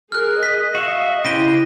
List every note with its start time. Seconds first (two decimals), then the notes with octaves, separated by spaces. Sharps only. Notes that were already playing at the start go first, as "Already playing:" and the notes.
0.12 G#4 A#4 F6 F#6
0.43 D#5 B6
0.75 F#4 E5 F5
1.25 C#3 E4 G4 C5 A#6 D#7 G7